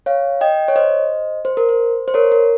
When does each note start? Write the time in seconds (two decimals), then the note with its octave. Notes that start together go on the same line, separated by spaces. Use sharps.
0.06 C#5 F5
0.41 D#5 G5
0.68 C#5
0.76 C5 D#5
1.45 C5
1.57 A#4
1.69 C5
2.08 C5
2.14 A#4 C#5
2.32 A#4